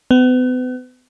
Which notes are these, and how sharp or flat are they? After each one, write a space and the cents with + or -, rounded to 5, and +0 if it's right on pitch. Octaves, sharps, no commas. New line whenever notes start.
B3 +40